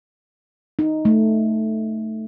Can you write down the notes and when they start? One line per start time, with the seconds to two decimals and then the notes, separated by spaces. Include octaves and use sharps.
0.79 D#4
1.05 A3